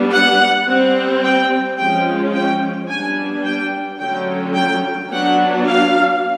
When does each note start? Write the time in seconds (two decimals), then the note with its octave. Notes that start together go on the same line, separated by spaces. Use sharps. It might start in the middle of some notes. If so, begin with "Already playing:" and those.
Already playing: G3 B3 D4
0.12 F#5
0.66 G3 C4
1.23 G5
1.78 F3 G#3 C#4 G5
2.34 G5
2.88 G3 B3 D4 G#5
3.45 G5
4.00 D3 F#3 A3 C#4 G5
4.55 G5
5.11 F#3 B3 D4 F#5
5.66 F5